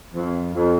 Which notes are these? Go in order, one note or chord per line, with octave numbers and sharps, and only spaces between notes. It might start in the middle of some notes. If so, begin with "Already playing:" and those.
F2
F2